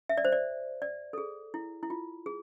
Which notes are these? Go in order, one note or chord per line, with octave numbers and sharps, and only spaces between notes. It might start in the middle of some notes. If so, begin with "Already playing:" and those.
E5
D5
C5
D5
D5
A4
G#4
E4
E4
F4
G#4